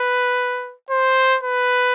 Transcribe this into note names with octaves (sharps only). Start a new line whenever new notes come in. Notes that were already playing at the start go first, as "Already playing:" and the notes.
Already playing: B4
C5
B4